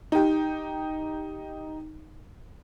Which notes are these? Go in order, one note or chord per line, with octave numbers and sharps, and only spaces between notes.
D#4 G4